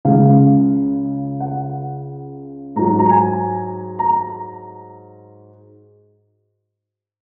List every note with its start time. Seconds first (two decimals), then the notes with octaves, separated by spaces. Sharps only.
0.05 C#2 C#3 G#3 F5
1.40 F#5
2.76 G#2 F#3 A#5
2.99 A#5
3.11 G#5
3.99 A#5